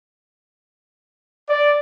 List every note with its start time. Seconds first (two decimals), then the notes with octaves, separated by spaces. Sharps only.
1.48 D5